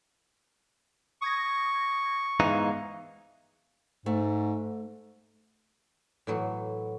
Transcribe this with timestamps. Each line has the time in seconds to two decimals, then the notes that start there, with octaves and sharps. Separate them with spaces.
1.22 C#6 D#6 G#6 A#6
2.40 G#2 E3 B3 D#4 F5
4.06 G#2 A3
6.27 A2 E3 F#3